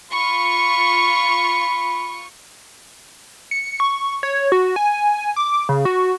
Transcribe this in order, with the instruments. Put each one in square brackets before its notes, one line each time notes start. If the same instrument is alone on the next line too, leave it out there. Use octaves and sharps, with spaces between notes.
[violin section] F4 C#6 [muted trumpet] B5
[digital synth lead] C#7
C#6
C#5
F#4
G#5
D6
C#3
F#4